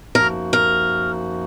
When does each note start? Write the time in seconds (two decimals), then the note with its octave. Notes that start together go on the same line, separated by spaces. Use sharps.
0.15 F#2 F3 A#3 D#4 F#4 A#4
0.53 A#4